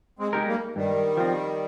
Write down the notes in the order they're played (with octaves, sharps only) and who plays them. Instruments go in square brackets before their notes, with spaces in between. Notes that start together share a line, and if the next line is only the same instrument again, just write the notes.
[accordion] G#3 C4
[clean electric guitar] G#3 D#4 G4 A#4
[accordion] G3 A#3
[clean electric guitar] G2 [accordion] D#3 G3
[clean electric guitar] F3 C4